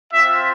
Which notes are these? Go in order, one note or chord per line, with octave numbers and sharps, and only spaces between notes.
C4 F4 E5